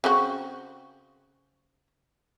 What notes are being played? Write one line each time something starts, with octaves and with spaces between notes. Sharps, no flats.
C#3 C4 F#4